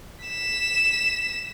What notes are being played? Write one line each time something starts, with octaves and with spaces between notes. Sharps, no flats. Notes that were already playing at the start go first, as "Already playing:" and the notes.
B6 E7